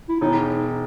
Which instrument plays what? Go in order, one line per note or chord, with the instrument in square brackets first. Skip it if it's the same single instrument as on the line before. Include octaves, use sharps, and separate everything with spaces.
[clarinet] E4
[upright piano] E1 [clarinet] D#4